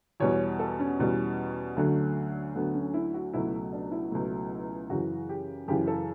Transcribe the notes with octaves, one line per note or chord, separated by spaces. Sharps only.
E2 B2 G3 C#5
A4
C#4
E2 B2 G3
D2 D3 F#3 A3
D2 D3 F#3 A3 B3
C#4
E4
F#4
C#2 B2 F#3 A3 E4
D4
E4
C#2 B2 F#3 A3
F#2 C#3 E3 F#4
G4
F#2 C#3 E3 G4
A4